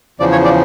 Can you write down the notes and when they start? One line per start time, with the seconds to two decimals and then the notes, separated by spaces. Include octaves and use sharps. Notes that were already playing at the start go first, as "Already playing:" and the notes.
0.20 E2 C#3 F3 D5
0.32 C#5
0.44 D5